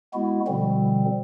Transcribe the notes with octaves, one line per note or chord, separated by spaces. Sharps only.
G#3 B3 E4 F#4
B2 D3 F3 G3 C4